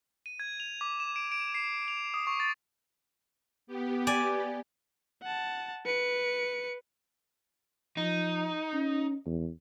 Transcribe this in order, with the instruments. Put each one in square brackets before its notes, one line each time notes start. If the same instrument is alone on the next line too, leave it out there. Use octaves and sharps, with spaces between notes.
[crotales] D#7
G#6
F7
D6
E7
D7
D7
C7
F7
D#6
C#6
A6
[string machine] B3 G4
[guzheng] D5 G#5
[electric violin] F#5 A5
B4 C#7
[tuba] F3 [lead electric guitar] D#4
[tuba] C#4
E2